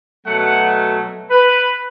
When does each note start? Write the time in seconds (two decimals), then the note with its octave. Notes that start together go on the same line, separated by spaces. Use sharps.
0.25 B2 F#3 A3 F#5
1.29 B4